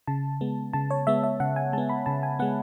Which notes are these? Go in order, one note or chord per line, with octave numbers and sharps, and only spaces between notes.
C#3 A5
G#3 B3
C#3 A5
C#5
G#3 B3 E5
E5
C#3 F#5
G#5
G#3 B3 A5
B5
C#3 A5
G#5
G#3 B3 F#5